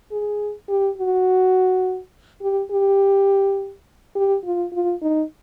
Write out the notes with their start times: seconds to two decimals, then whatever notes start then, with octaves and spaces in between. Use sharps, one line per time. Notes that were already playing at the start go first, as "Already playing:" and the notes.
0.11 G#4
0.69 G4
0.98 F#4
2.42 G4
2.71 G4
4.15 G4
4.44 F4
4.73 F4
5.02 D#4